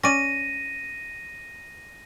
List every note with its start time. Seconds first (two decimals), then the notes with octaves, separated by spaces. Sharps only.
0.03 C#4 D5 A#6 D#7